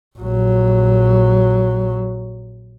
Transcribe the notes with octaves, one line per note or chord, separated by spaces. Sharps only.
A#1 F#3